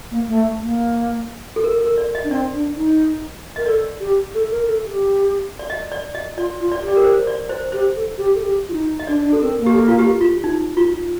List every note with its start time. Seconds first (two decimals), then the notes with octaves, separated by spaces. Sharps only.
0.11 A#3
0.28 A3
0.62 A#3
1.56 A4
1.64 A#4
1.81 A#4
1.98 D5
2.15 D#5
2.24 D4
2.30 C4 D5
2.54 D4
2.76 D#4
3.56 A#4 D#5
3.66 A4 D5
4.00 G4
4.34 A4
4.51 A#4
4.68 A4
4.85 G4
5.59 D5
5.70 D#5
5.92 D5
6.15 D#5
6.37 F4 D5
6.60 F4
6.72 D5
6.83 G4
6.88 D5
6.96 A#4
7.04 C5
7.27 D5
7.49 C5
7.72 G4 C5
7.96 A4
8.18 G4
8.35 A4
8.41 G4
8.69 F4
8.73 D#4
8.99 D#5
9.07 D4 D5
9.24 D4
9.33 A4
9.41 C4 A#4
9.58 A#3
9.66 G4
9.75 A4
9.88 F4
9.99 G4
10.21 F4
10.44 D#4
10.77 F4